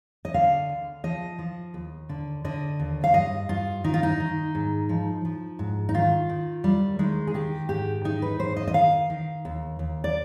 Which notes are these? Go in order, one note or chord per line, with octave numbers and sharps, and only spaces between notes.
D#5
D3 F5
D2
F3 D#5
F3
D#2
D3
D3 D#5
D#2
F5
G2 D#5
G2 F4
D#3 D#4
F4
D#4
D#3
G#2
F3
F3
G#2
D#4
D#3 F4
D#3
D#2 G3
D#3 G#3
G#4
D#3 G4
G#2 G4
D#3 D#4
B4
G#2 C5
D#5
D#5
D#3 F5
D#3
D#2
D#2
D5